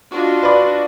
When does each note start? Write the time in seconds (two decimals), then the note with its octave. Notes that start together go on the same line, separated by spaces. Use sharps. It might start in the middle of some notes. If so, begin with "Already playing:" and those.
0.12 D4 F4 F#4 D#5
0.43 B4 D5